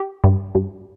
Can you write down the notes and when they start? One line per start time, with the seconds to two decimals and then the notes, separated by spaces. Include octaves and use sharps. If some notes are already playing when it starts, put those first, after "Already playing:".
Already playing: G4
0.24 G2
0.55 G2